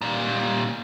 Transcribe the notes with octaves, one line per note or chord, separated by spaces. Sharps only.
A#2 G3